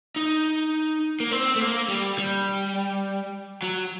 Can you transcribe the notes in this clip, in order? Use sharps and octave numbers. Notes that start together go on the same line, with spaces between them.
D#4
A#3
C4
A3
A#3
G3
G3
F#3